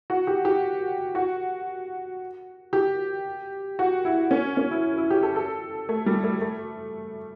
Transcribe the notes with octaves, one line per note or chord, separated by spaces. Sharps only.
F#4
G4
G4
F#4
G4
F#4
E4
C#4
C#4
E4
E4
G4
A4
A4
A3
G3
A3
A3